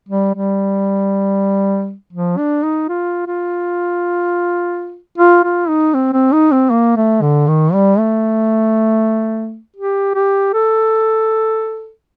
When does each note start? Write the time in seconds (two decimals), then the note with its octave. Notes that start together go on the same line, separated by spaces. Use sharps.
0.09 G3
0.34 G3
2.13 F3
2.38 D4
2.63 D#4
2.89 F4
3.27 F4
5.18 F4
5.44 F4
5.69 D#4
5.94 C4
6.13 C4
6.32 D#4
6.52 C4
6.71 A#3
6.97 A3
7.22 D3
7.48 D#3
7.73 G3
7.99 A3
9.76 G4
10.15 G4
10.53 A4